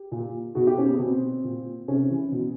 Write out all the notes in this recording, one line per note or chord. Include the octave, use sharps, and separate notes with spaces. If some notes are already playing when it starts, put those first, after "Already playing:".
Already playing: G4
A#2
B2 F#4
G4
C#4
B3
B2 C4
A#2
C3 C#4
E3
B2